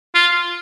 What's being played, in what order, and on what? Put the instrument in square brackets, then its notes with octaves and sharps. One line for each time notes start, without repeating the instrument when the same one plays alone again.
[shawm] F4